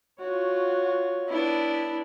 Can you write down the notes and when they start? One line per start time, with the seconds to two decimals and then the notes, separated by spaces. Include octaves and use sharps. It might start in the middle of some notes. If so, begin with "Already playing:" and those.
0.20 F4 F#4 C#5
1.28 B3 D4 E4